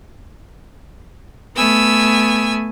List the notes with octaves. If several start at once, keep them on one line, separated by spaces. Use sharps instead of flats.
A3 B3 G#5 E6